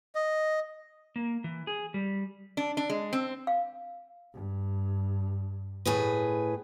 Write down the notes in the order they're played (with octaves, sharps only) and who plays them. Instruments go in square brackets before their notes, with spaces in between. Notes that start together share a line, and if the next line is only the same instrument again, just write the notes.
[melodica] D#5
[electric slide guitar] A#3
E3
G#4
G3
[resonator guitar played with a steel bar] D4
D4
G#3
C4
[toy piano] F5
[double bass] G2
[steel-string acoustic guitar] A2 G#4 B4